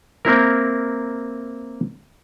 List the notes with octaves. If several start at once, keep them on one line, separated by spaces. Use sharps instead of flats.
A#3 C4 E4 A#4